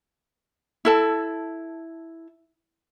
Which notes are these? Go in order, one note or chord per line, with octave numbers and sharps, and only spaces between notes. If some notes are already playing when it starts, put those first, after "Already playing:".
E4 A4 A5